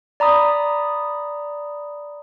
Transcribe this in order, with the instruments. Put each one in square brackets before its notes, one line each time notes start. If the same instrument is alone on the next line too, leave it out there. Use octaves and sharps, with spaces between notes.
[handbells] D5 A#5 B5 D#6